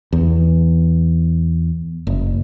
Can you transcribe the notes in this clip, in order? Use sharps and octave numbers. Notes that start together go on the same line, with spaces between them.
E2
F#1